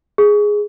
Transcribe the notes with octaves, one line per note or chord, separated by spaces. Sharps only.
G#4